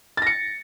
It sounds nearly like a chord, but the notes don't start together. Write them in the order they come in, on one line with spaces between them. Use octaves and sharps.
A6 A#6 C#7